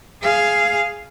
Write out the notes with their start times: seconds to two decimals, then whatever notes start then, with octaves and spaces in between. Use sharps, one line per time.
0.22 G#4 F5